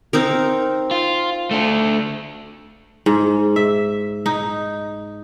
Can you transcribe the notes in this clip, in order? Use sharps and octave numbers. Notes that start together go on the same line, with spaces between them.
C4 D#4 A#4
F4
A3 D4
G#2
E5
D#4